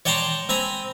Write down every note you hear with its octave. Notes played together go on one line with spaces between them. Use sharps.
C#5 D5 G5 A5 A#5 C6
C4 G#5 A#5 B5